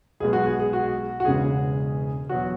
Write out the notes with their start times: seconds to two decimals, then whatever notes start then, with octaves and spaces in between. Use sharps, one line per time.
0.20 B1 B2 G#3 G#4
0.33 F#4
0.46 G#4
0.59 G#4
0.73 F#4
1.20 F#4
1.25 E1 E2 C#3 G#3 G#4
2.29 E2 B2 F#3 F#4